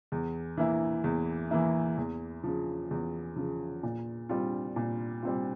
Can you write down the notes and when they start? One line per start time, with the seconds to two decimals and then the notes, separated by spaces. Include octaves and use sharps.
0.12 E2
0.57 E3 A#3 E4
1.04 E2
1.51 E3 A#3 E4
1.98 E2
2.44 C#3 F3
2.91 E2
3.36 C#3 F3
3.83 A#2
4.29 G3 C4 F4
4.76 A#2
5.22 G3 C4 F4